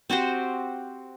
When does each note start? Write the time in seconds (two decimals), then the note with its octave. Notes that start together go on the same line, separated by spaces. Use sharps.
0.10 C4 F#4 G4 C5